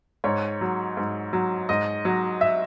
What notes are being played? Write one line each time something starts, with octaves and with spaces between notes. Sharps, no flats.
G#2 C#5
F#3
G#2
F#3
G#2 D#5
F#3
E5